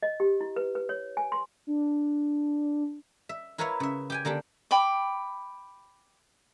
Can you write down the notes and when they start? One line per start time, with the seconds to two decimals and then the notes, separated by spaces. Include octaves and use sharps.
0.03 D#5
0.20 G4
0.41 E4
0.56 B4
0.75 B4
0.89 C#5
1.17 G#5
1.32 C6
1.67 D4
3.29 E5
3.58 E4 A#4 B4 C#5 E5 F5
3.80 C#3 E5
4.10 G4 G5 G#5
4.25 D3 A#3 D4 G4
4.71 G5 B5 D6